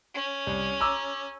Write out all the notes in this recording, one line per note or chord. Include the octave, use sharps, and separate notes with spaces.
C#4
C2
A#5 D6 E6